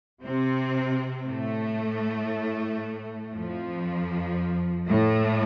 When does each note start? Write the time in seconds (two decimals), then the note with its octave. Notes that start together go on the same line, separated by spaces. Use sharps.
0.24 C3 C4
1.27 A2 A3
3.34 F2 F3
4.88 A2 A3